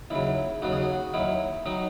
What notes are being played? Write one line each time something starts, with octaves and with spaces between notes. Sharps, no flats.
D#2 C#3 F#3 E4
D#2 C#3 F#3 F#4
G#4
F#4
D#2 D#3 F#3 E4
D#3 F#3 D#4